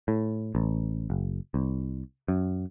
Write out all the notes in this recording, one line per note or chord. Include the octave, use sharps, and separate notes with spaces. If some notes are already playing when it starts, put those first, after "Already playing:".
A2
A1
F#1
C2
F#2